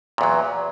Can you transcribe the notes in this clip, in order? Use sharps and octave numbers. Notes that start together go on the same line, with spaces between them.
E2 A#2 F#3